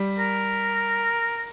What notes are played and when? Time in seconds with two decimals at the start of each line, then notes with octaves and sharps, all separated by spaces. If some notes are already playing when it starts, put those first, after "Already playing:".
Already playing: G3
0.19 A#4